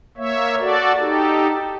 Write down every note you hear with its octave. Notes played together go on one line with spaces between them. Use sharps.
A#3 C#5 E5
F#4 A4 D5
D#4 G4 A4